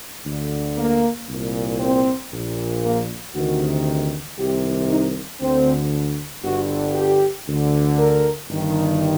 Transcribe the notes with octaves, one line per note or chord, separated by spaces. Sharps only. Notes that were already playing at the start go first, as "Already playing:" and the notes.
D2 D3
A#3
C2 A#2
C4
A#1 A#2
A#3
D2 C3 D#3 F#4
C2 C3 D#3 G4
D#4
D2 D3 C4
G1 G2 D3 F#4
G4
D2 D3
A#4
G1 G2 D#3